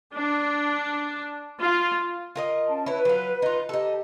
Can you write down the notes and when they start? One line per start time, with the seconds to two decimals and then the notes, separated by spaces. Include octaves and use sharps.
0.16 D4
1.59 F4
2.35 F4 A#4 D#5
2.68 C#4 A5
2.86 E4 B4 C#5
3.05 F#3 F4
3.42 D#4 F4
3.69 D#4 G4 A4